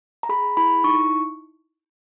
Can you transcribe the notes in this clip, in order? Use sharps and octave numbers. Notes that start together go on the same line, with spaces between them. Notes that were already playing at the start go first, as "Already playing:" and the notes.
A#5
G#4 B5
E4 B5
D#4 C#6